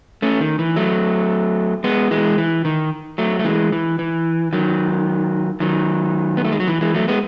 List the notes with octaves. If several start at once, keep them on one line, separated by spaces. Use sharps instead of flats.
A3 C#4
D#3
E3
F#3 A3
G#3 B3
E3 G#3
E3
D#3
F#3 A3
A3
E3 G#3
E3
E3
D#3 F#3
D#3 F#3
B3
A3
G#3
F#3
E3
E3 G#3
F#3 A3
G#3 B3